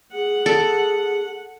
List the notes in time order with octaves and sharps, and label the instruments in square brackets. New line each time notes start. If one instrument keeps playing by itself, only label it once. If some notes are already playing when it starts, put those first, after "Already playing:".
[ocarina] G#4 [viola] F#5
[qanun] A4